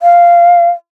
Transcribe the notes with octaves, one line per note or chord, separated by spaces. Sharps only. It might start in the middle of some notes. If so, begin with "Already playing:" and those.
F5